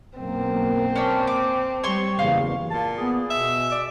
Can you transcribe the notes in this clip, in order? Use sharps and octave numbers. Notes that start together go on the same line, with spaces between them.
B1 F#2 A#3 C4
C#4 D4
D6
G3 C#5 C6 C#6
F#1 E2 F5
A#2 A5
B3 G#4
B2 E5
D5